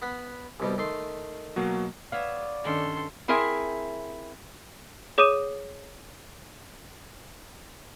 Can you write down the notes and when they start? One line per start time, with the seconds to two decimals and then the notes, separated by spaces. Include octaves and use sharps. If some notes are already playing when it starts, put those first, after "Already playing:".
0.02 B3 F#5 B5
0.60 C2 B2 G3
0.78 D#3 A3 C6
1.56 B2 F#3 A#3
2.12 B3 C#5 D5 E5 F5
2.64 G2 D#3 C#4 A4 C6
3.28 C4 E4 G#4 A#4 E5
5.18 G#4 C#5 D6 D#6 D#7 E7